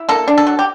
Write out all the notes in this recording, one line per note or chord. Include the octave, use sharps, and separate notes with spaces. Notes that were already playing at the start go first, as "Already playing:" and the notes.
Already playing: E4
A#3 A4
D4
A4
F#3
G4